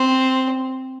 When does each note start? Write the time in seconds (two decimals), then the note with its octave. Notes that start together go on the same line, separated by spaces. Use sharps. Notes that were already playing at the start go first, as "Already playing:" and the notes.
Already playing: C4